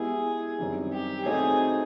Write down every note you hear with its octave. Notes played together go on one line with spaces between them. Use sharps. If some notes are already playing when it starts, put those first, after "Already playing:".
Already playing: G#3 B3 E4 G4 G#4
F#2 D#3 G3 C4
G4
A3 C4 D#4 F#4 G#4